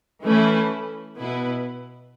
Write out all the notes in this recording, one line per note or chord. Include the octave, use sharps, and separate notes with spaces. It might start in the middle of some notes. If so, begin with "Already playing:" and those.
E3 A3 C#4 E4 B4
B2 B3 E4 B4